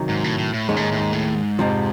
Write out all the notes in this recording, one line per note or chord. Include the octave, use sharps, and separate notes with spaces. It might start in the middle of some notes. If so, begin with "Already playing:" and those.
Already playing: C3 D#3 F#3
G#2
A2
A2
A2
D#2 G#2 D#3 G#3 C#4
A2
G#2
A2
G#2
A2
G#2
F2 C3 F3